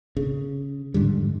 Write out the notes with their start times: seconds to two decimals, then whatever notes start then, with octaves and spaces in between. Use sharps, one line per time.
0.17 C#3
0.94 F2 G#2 D3 G3